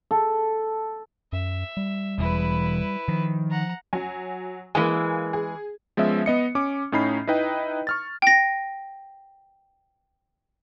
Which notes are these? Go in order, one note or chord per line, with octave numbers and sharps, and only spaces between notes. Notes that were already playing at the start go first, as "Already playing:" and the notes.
A4
F#2 E5
G3
E1 E2 E4 B4
D#3 F3
F#5 A#5
F#3 G#5
E3 G#3 A#3 G#5
G#4
F3 G#3 B3 C#4 E5
B3 D#5 C#7
C#4 D6
A2 C#4 D#4 B5 C7
D#4 E4 B4 D#5 G5
C#6 F6 A6
G5 A#6